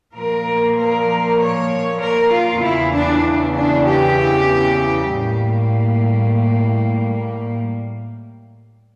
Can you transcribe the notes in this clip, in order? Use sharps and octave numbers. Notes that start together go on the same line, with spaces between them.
A#2 F3 A#3 A#4
A#4
C#5
A#4
F4
E2 C#3 E3 E4
D4
D4
G4
A2 G3 A#3